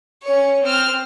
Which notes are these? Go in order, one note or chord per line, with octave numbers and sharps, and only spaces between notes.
C#4 C#5
C4 F6